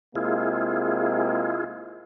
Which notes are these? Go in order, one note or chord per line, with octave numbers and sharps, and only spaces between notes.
C3 G#3 A#3 E4 F4 G#4